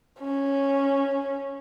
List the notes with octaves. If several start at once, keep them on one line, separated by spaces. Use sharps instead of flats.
C#4